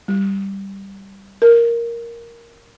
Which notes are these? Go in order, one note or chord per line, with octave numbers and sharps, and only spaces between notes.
G3
A#4